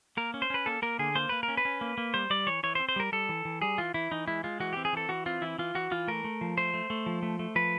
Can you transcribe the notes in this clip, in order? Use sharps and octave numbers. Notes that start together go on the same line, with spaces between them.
A#3 A#4
C#4
C5
C#4 B4
A#3 A4
A#3 A#4
D3 G#4
A#3 C5
A#3 B4
A#4
C#4
B4
C#4
A#3
A#3
G3 C5
G3 D5
E3 C#5
E3 C#5
C5
C4
C5
G3 A#4
G3 A4
E3
E3
G3 G#4
E3 F4
E3 E4
E3 D#4
G#3 E4
G#3 F4
E3 F#4
C4 G4
G#4
E3 A4
E3 F#4
C4 F4
E3 E4
E3 F4
E3 F#4
E3 F4
A3 A#4
A3
F3
A3 C5
A3
A3
F3
A3
A3
F3 B4